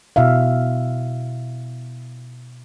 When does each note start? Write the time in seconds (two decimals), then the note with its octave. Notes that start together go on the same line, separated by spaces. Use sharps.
0.16 B2 E4 E5 F5